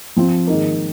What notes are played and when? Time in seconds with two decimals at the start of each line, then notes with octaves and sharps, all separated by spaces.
0.17 F3 C4 F4
0.47 G#2 D#3 A#3